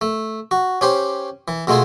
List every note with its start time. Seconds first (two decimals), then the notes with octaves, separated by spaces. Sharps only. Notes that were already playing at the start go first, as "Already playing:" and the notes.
0.01 A3
0.51 F#4
0.81 C#4 G4 C5
1.48 E3
1.67 B2 G#3 A3 F4 G#4